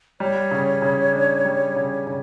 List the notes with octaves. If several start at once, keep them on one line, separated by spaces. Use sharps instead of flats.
G3 C#5
C#3
C#3
D4
G3
C#3
C#3